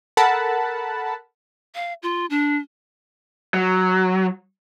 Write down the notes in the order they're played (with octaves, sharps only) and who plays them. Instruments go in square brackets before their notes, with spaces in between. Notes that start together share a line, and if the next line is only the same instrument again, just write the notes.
[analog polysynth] A4 A#4 F#5 A5 B5
[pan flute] F5
F4
D4
[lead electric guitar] F#3